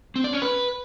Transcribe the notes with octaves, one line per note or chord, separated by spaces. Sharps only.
C4
D5
C#4
B4